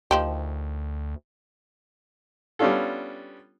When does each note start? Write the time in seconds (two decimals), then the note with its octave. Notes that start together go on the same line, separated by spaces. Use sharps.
0.11 D2 D#3 F3 G4
2.59 G3 B3 C#4 D4 F4 A4